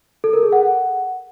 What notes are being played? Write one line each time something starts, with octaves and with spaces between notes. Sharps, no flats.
A4
A#4
G#4
F#5